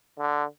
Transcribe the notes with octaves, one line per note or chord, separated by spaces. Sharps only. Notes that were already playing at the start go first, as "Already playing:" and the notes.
D3